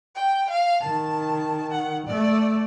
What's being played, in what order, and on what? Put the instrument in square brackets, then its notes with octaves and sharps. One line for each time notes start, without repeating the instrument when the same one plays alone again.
[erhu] G5
F5
[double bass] D#3 [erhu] A5
[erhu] F#5
[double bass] A3 [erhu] D5